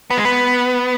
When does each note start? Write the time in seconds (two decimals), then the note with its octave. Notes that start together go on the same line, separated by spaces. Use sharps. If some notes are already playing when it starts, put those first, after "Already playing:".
0.10 B3
0.17 G#3
0.25 B3